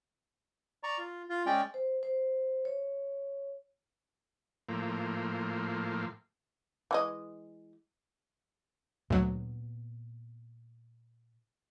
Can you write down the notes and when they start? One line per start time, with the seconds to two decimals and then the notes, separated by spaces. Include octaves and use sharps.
0.83 D5 A#5 C#6
0.98 F4
1.29 F4
1.46 G#3 C#4 D5 G5
1.74 C5
2.03 C5
2.65 C#5
4.69 A2 F3 A#3
6.91 E3 G#3 D#5
9.10 D2 A#2 F#3 B3